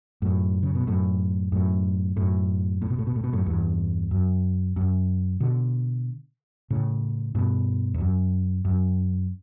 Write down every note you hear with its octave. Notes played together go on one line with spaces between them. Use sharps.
F#2 A2
C#3
B2
F#2 A2
F#2 A2
F#2 A2
A2
B2
A2
B2
A2
B2
F#2 A2
E2 G2
F#2
F#2
B2 D3
A2 C#3
G2 B2
E2
F#2
F#2